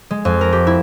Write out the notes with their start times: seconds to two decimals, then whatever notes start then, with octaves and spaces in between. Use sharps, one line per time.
0.11 G#3
0.25 F2
0.41 A#4
0.53 G4
0.67 E4